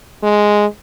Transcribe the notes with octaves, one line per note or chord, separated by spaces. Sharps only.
G#3